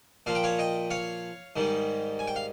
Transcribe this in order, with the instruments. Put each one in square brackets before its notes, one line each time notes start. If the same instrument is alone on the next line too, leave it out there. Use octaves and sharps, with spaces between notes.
[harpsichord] A#2 F3 F5
G5
C#5 F5
D#5 G5
C#5 F5
G#2 D#3 G3
G#5
G5
F5